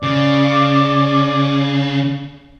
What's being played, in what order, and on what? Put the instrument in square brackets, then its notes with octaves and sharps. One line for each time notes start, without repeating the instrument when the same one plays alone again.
[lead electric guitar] C#3 [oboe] D5